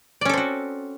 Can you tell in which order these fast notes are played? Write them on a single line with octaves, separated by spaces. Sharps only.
D5 C#4 A4 C4 F#4